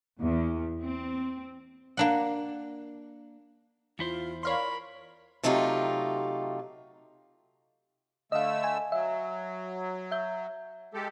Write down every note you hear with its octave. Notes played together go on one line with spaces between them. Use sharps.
E2
C4
A#3 D4 F#5
E2 E4 F4 C5
A#4 C#5 D5 F5 B5 C6
C3 F#3 A3 D#4 F4 G4
D3 A3 D#5 F5 E6
G#5
F#3 E5
E5 G6
G#3 G4 A4